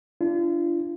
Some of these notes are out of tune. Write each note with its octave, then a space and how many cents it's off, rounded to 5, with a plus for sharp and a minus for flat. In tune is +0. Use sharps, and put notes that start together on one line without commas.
D4 +0 F4 -35